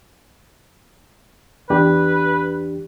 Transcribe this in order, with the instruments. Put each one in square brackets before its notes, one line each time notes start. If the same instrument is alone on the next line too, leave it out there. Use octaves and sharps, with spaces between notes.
[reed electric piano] E2 D4 G4 [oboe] B4